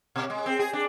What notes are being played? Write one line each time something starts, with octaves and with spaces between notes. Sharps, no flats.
B2
G#3
C4
G#4
D4